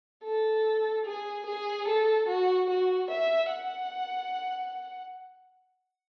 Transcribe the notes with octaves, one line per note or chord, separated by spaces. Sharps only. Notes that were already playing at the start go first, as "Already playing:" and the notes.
A4
G#4
G#4
A4
F#4
F#4
E5
F#5